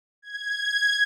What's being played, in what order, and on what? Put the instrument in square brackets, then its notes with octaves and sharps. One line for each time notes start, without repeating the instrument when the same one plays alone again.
[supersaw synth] G#6